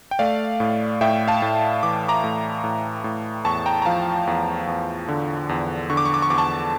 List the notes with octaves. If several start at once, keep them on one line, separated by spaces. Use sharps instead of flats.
G5
A3 D5 F5
A2
A2 E5 G5
F5 A5
A2
E3 D6
A#5 D6
A2
A2
A2
E2 A5 C#6
G5 A#5
A#5
F3 F5 A5
E2
E2
D3
E2
D3 C#6
D6
C#6
D6
C#6
E2 D6
A5 C#6